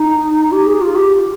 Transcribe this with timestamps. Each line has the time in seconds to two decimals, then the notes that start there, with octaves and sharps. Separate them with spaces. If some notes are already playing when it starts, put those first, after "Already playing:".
Already playing: D#4
0.51 G4
0.66 G#4
0.81 F4
0.95 G4